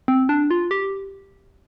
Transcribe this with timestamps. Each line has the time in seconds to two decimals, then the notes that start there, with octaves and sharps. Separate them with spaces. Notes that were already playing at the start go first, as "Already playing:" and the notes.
0.08 C4
0.29 D4
0.51 F4
0.71 G4